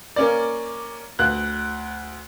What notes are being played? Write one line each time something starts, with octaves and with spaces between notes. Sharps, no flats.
A#3 C#4 D5
D2 F#6